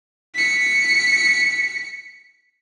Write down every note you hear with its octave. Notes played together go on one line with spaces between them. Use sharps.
B6 C#7